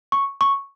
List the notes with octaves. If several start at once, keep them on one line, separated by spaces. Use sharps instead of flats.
C#6
C#6